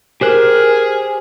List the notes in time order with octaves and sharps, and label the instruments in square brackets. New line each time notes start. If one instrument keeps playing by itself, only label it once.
[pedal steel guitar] G4 C5 F#6 [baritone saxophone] G#4 [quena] A#4